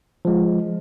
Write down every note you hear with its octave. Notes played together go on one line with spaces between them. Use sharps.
F3 G#3